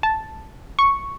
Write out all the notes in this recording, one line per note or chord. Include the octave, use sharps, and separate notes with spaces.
A5
C#6